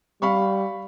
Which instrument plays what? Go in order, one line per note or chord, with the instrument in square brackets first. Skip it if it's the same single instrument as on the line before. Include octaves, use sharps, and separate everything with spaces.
[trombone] G3 [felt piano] F5 B5 C#6